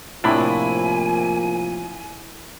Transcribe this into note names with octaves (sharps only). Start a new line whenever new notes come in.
A2 C3 F3 A#3 D4 E4 G#5 B5